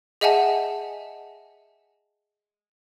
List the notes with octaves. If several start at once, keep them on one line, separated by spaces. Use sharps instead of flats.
G#4 D#5 E5 F#5 G#5 A5